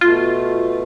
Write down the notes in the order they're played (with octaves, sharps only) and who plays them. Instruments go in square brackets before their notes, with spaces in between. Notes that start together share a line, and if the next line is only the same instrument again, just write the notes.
[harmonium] B2 A3 [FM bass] F4